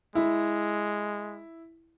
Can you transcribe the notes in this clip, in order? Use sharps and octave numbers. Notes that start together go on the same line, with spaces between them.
G#3 E4